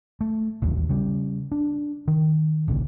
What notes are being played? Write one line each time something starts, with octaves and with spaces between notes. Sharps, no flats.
A3
D#1 A1 D#2 F#3
C#3 G3
D4
D#3
D1 A#1 A#2 C#3